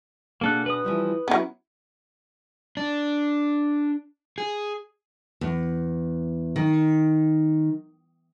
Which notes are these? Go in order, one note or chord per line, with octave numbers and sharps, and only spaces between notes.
B2 A#3 D4 G#4 A4 F#6
B4 D#6
E3 F3 G3
F#3 B3 C#4 E4
D4
G#4
E2
D#3